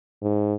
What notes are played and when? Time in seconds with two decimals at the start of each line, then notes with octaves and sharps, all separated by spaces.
0.22 G#2